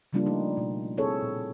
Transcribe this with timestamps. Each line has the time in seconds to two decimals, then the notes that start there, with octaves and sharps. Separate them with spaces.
0.13 C#3 F3 G3 A#3 D4 F4
0.26 A3 D#4
0.57 B2
0.97 C4 E4 G#4 A4 C#5
1.22 A#2